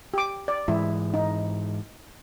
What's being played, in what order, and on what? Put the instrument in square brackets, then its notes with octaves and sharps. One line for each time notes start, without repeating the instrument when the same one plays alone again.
[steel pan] G4 D6
D5
[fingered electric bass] G#2 E3 G#3 [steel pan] E4
[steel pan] D#4